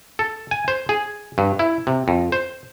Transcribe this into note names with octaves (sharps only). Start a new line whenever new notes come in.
A4
G#5
C5
G#4
G2
E4
C3
F2
C5